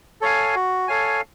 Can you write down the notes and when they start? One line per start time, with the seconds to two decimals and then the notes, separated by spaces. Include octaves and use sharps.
0.21 A4 C#5 F5 G#5
0.55 F#4
0.88 A4 C#5 F5 G#5